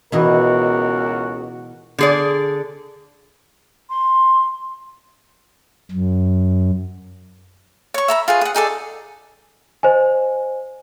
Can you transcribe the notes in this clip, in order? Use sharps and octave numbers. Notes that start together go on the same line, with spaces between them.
C#2 B2 E3 F#4 A#4 D#5
D3 G#4 D5
C6
F#2
C#5 C#6
E5 A#5 B5
F4 G#4 B4
G#4 F#5
D#4 G#4 A4 D5
C5 D#5 G#5